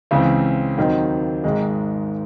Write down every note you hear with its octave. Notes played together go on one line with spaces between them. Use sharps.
C#2 C#3 E3 C4
D#2 D#3 F#3 C4 D#4
G#1 G#2 D#3 G#3